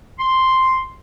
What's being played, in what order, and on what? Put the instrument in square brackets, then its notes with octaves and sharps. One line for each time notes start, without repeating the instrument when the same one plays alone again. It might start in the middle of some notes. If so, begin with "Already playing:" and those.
[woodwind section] C6